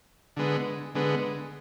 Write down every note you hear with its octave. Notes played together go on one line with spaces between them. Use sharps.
D3 G#3 B3
D3 G#3 B3